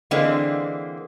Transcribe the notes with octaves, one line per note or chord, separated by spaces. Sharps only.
D3 E3 G#3 A#3 C4